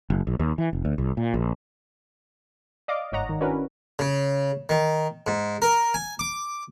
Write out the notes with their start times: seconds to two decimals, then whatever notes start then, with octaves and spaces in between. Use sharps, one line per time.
0.10 F#1
0.27 B1
0.40 D#2
0.58 E3
0.73 F1
0.85 D2
0.98 C2
1.17 A#2
1.34 A#1
2.88 D5 D#5 F5 D6
3.12 G1 G#2 C#5 D#5 F#5 A#5
3.29 D#3
3.41 C#4 D4 E4 F#4 A#4 B4
3.99 C#3
4.69 D#3
5.27 G#2
5.62 A#4
5.94 G#5
6.19 D6